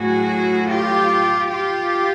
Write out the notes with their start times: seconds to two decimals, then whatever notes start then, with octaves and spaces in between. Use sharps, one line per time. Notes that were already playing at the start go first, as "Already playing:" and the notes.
Already playing: A2 F#3 F#4 G#4
0.70 F4 G4
1.50 F4 G4